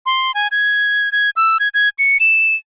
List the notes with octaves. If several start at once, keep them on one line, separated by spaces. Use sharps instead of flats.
C6
G#5
G#6
G#6
E6
G#6
G#6
C#7
E7